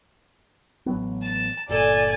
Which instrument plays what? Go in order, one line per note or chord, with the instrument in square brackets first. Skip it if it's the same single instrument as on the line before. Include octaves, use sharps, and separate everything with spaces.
[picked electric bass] A1 F#3 B3
[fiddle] A5
[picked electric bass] G1 A#2 [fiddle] A4 [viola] D5 G#5